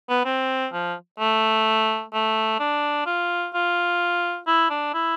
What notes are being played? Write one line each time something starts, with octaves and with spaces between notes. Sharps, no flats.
B3
C4
F3
A3
A3
D4
F4
F4
E4
D4
E4